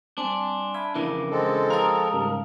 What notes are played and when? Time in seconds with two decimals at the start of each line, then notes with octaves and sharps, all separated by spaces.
0.18 G3 C4 D4 G#5 C6
0.74 E5 F5 G#5 B5
0.95 F2 C#3 E3 F3 D4 E4 A#4
1.31 G#3 C4 A4
1.70 A#4 F5 A5 D#6
2.13 G#2 C#3 G3